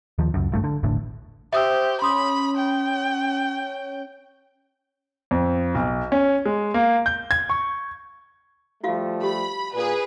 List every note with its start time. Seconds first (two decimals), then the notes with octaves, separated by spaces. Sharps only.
0.18 D#2 D#3 F3
0.34 C#2 F#2
0.52 G#1 G2 A3
0.64 D3
0.83 E1 A1 A2 D3
1.53 G4 C5 E5 D#6 E6
2.02 C#4 B5 C6 D#6
2.57 G5
5.31 F2
5.75 B1
6.12 C#4
6.46 G#3
6.74 A#3
7.06 G6
7.31 G#6
7.49 C#6
8.84 F3 G3 A3 F4 F#4 F5
9.23 G4 B5
9.74 A#2 G#4 B4